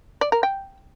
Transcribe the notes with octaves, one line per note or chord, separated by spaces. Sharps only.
D5
A#4
G5